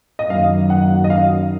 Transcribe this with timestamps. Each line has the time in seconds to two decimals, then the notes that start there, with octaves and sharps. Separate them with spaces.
0.19 D#5
0.30 F#2 D#3 F#3 A#3 F5
0.70 F#5
1.04 D#5
1.10 F5